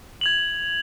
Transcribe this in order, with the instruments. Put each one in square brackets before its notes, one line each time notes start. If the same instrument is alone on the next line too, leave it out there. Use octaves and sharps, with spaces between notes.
[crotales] G#6 F7 F#7